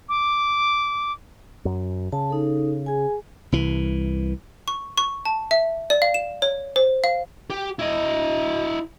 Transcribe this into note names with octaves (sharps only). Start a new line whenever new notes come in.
D6
F#2
C#3 A5
D#4 A4
G#4 G#5
C2 E3
C#6
C#6
A5
E5
D5
F5
E7
C#5
C5
F5
G4
E4 D#5